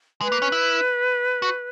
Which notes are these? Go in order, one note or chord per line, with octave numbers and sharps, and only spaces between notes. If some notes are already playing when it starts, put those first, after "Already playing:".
G#3 B4
A#3
C#4
E4
F#4